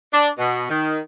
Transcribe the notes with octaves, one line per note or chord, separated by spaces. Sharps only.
D4
B2
D#3